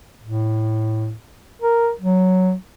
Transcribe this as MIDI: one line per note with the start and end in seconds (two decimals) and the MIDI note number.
0.24 1.13 45
1.62 1.91 70
2.01 2.54 54